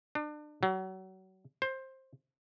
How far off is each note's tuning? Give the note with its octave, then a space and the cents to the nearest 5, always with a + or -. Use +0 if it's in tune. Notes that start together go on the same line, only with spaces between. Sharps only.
D4 +35
F#3 +30
C5 +15